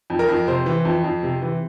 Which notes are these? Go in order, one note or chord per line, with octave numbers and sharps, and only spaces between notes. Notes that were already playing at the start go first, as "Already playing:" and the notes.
F2
A#4
F2
C3 C5
E3
F2
F2
C3
E3